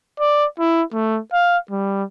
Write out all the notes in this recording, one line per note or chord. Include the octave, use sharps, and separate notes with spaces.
D5
E4
A3
F5
G3